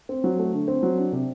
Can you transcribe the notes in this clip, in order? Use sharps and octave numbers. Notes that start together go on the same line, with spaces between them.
C4
F#3
A3
D3
C4
F#3
D4
C3